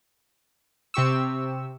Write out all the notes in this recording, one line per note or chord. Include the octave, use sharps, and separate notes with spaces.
C3 G4 C#6 E6